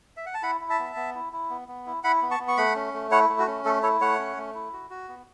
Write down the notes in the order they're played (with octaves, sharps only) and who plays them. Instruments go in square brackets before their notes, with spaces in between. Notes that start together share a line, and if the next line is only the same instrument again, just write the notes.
[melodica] E5
F#5
A5
E4 F#5 B5
E4
E5 A5
B3
B3
E4
E4
B3
B3
E4
E4 F#5 B5
B3
A5 C#6
B3
C#6
A3 F#5 B5
C#4
A3
E4 C#5 F#5
A3
F#4
C#4
A3 A4
E4 A4 C#5
A3 C#5 F#5
C#4
A3
E4
F#4
F#4
B3